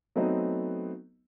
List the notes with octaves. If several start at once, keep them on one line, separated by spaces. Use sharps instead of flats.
F#3 A3 B3 C4 D#4 D#5